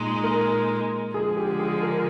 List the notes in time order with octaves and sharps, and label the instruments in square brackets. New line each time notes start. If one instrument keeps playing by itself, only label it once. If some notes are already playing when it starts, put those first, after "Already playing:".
Already playing: [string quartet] A#2 G#3 D#4
[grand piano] A#4
[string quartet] D3 F3 G#3 [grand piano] G#4
[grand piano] G4
G#4
A#4